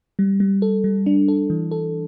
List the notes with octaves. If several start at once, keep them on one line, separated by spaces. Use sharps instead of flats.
G3
G3
A4
G3
D4
A4
E3
A4